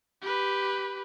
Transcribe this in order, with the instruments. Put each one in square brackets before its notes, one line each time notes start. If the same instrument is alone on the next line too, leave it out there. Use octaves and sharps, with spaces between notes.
[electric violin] G4 B4